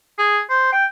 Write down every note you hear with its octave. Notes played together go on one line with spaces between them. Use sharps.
G#4
C5
G5